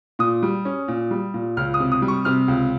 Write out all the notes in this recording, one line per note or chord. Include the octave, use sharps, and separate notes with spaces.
A#2 D#6
G3
C#4
A#2
G3
A#2
C#2 F6
D#6
C3
D#6
G3
C#6
C3 F6
C#2